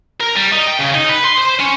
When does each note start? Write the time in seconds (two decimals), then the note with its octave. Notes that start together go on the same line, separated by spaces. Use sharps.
0.20 A#4
0.36 G3
0.52 D#4
0.67 G5
0.79 C#3
0.95 D#4
1.10 B4
1.25 C6
1.38 C5
1.60 C#4